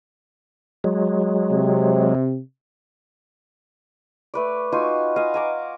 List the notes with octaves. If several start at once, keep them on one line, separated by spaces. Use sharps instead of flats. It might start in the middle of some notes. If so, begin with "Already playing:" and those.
F#3 G#3
C3
A3 B4 D5
D#4 F4 F#4 G#5
D#5 F5 F#5 G#5
G#5 A#5 D6